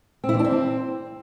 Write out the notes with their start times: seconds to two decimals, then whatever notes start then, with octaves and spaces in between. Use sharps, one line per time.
0.24 C4
0.29 E4
0.34 E3
0.39 D4
0.45 C4